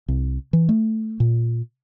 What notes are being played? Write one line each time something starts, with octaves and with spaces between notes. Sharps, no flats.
C2
E3
A3
A#2